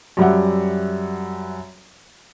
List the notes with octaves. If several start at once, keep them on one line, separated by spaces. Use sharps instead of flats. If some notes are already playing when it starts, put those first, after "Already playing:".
F#2 G3 E5 F#5